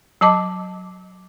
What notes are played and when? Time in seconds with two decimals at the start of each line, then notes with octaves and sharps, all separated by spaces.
0.21 F#3 D#5 A5 D6